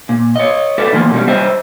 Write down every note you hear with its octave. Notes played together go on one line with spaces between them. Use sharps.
A#2
C#5 D#5
A4 B4 D5 E5
D3 E3 F3 A#3
B2 G3 C#4
G3 C5 D#5 E5